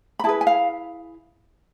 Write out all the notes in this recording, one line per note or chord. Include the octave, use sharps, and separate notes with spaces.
B5
E4 G#4 B4 A5
G#5
F5